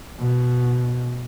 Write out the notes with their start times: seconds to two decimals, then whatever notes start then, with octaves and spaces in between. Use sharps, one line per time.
0.20 B2